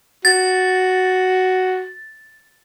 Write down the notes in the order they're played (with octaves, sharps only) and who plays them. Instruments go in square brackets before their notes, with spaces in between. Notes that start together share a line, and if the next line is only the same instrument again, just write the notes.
[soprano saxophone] F#4 [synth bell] A6